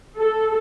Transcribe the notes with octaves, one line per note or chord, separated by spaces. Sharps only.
A4